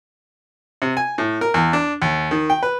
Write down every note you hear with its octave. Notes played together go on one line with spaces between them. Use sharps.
C3
G#5
A2
A#4
E2
D4
D#2
D#3
G5
B4